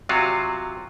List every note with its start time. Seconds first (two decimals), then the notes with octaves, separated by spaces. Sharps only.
0.09 C3 F#3 F4 F#4